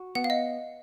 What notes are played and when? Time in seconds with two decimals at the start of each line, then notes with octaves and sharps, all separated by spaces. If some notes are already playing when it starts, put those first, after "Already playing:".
Already playing: F#4
0.15 B3 F#5
0.24 F5
0.30 D#5